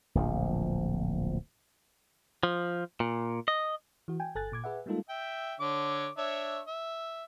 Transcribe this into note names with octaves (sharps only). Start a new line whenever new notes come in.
D1 A#1 F3
F3
A#2
D#5
E3 F#4
G5 G#5
G1 A4 G#5 F#6 A6
A#2 D6 G#6
G#4 B4 E5 F#5
G3 G#3 A#3 D#4 F4 A4
E5 G5
D3 C#5 D6
D4 C#5 E5
E5